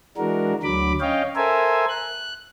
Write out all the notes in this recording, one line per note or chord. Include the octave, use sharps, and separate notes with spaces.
E3 G#3 D4 F#4 A#4
D2 D3 F#3 B5 D6
C#4 C#5 D#5 F5 G5
A4 A#4 C5 E5 G#5
F#6